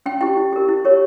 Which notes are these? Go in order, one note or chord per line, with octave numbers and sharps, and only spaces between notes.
C#4 G5
E4 G4 G5
E4
G4 A#4
E4
G4 A#4 C#5